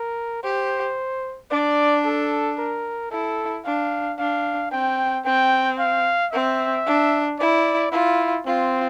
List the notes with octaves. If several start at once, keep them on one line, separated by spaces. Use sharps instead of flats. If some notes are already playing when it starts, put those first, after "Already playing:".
Already playing: A#4
G4 C5
D4 D5
A4
A#4
E4 A4
D4 F5
D4 F5
C4 G5
C4 G5
F5
C4 E5
D4
E4 D5
E4 F4
C4 F4